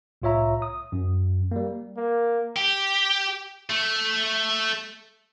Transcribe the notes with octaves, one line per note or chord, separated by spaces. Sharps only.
C2 A2 F4 C#5 E5 A#5
D#6
F#2
G3 A#3
A#3
G4
A3